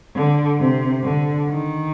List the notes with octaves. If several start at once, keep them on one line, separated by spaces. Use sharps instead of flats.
D3
C3
D3
D#3